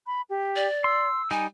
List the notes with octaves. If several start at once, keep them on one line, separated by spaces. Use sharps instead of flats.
B5
G4
D5
C6 E6
G3 D#4 G5 G#5